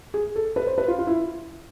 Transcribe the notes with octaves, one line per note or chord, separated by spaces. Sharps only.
G#4
A4
B4
C5
B4
F4
F4
E4